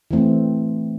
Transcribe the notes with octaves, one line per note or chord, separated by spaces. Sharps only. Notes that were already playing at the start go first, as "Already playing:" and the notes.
E3 A3 C4